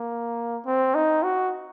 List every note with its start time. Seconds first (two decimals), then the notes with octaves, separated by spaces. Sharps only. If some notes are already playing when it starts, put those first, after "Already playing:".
Already playing: A#3
0.66 C4
0.95 D#4
1.23 F#4